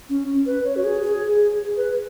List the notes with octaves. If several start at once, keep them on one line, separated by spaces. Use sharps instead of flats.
C#4
B4
C#5
F#4
G#4
G#4
B4